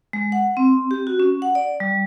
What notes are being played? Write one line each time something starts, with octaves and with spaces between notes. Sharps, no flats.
G#3
F#5
C4
G4
F#4
C#4
F#5
D5
G3